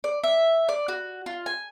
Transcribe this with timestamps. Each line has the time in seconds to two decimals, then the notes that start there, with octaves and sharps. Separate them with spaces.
0.04 D5
0.24 E5
0.69 D5
0.88 F#4
1.26 F4
1.46 G#5